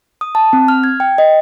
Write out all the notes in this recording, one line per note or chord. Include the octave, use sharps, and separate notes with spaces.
D#6
A5
C4
F6
G#6
G5
D#5